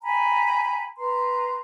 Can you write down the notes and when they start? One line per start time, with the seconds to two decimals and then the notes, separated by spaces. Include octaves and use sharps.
0.03 G5 G#5 A#5 B5
0.98 B4 A#5 C6